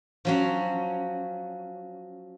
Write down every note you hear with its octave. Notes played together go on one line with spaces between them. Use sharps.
F3 F#3 C#4